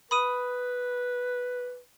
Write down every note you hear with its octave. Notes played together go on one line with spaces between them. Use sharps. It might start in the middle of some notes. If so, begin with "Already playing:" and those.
B4 B5 D#6 D#7